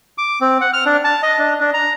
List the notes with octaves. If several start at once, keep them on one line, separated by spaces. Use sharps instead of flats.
D6
C4
F#5
F6
D4
A5
D#5
D4
D4
A#5